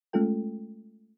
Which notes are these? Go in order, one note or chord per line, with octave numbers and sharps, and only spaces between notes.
G#3 A3 C#4 F4 A4 G5